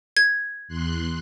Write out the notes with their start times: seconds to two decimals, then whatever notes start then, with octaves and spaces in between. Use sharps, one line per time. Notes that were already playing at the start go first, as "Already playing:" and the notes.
0.17 G#6
0.68 E2 C6 F#6